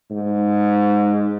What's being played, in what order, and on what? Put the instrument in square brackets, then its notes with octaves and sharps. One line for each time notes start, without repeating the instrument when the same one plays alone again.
[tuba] G#2